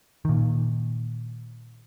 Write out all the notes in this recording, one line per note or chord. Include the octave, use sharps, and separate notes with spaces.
A#2 D#3